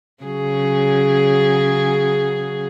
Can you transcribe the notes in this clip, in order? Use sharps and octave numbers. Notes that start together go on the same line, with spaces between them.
C#3 F#3 G#4